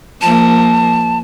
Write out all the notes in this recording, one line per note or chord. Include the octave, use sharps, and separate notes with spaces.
F3 A#3 A5